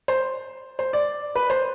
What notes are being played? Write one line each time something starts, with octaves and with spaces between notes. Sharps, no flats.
C5
C5
D5
B4
C5